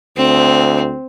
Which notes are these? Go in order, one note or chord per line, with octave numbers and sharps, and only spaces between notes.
D2 C4